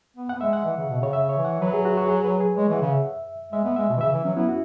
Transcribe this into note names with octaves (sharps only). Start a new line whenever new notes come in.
B3
B3 F#5
G#3 E5
F#5
E3
C#3
B2
C#3 C#5
C#3 E5
C#5
E3
F#5
F#3 B4
G#4
F#4
F#4
G#4
B4
G#4
G#3 C#5
E3 F#5
C#3
E5
G#3 E5
B3
G#3 E5
B2
E3
C#3 E5
E3 E5
F#3 C#4
B3 E4
F#4